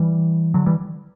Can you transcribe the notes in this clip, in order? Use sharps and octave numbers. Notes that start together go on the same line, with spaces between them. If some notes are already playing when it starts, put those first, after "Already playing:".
Already playing: E3 G3
D3 F#3
E3 G3